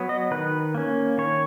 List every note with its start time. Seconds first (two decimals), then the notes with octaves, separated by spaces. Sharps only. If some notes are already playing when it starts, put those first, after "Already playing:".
Already playing: F#3 B3
0.09 D#5
0.31 D#3 B4
0.75 A#3 C#4
1.18 D#3 C#5